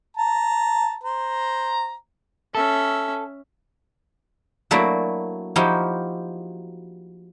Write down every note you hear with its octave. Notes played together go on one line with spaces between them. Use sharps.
A5 A#5
C5 A#5
C#4 A4 E5
F#3 A3 A#3 D4 E4 F#4
F3 D#4 E4 F#4 G4